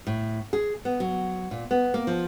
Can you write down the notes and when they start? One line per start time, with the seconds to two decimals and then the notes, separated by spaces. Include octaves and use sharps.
0.07 A2
0.53 G#4
0.85 B3
1.00 F#3
1.51 A#2
1.71 B3
1.94 A#3
2.07 F3